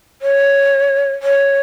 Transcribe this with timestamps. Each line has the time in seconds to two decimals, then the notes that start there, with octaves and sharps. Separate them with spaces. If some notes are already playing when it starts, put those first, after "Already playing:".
0.21 C#5
1.22 C#5